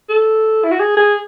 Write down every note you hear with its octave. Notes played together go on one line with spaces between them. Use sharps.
A4
E4
F#4
G#4
G#4